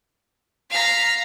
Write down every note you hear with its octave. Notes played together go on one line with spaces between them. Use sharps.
F5 A#5 F6 B6